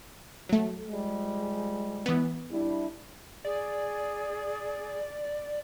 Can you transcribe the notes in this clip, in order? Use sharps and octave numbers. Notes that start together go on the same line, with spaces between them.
F#3 A3
F3 G3 G#3
E3 B3
G3 D4 E4
G#4 D5